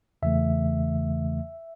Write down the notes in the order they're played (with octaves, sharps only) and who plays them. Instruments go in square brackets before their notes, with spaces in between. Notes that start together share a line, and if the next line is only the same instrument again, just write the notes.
[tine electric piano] E2 C#3 E3 A3 E5